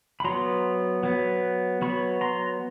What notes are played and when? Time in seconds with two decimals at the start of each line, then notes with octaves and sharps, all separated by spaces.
0.20 B5
0.24 F#3 B3 A#5 C6
1.03 F#3 B3
1.82 F#3 B3 B5 C#6
2.21 A#5 C6